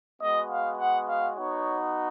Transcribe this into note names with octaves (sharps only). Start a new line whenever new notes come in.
G#3 B3 F#4 D#5
F5
F#5
F5
B3 D#4 F#4 C#5